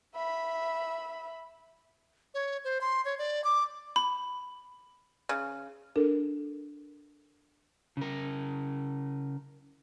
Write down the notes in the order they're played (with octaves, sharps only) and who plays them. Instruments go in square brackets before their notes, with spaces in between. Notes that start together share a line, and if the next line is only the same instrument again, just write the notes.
[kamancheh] E5 B5
[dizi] C#5
C5
C6
C#5
D5
D6
[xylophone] B5
[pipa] C#3
[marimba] D4 A4 A#4
[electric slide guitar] C#3 A#4